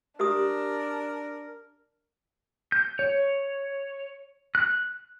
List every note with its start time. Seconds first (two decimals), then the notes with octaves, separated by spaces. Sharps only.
0.20 D4 G4 A#4 D#6
2.72 G6
2.99 C#5
4.55 F#6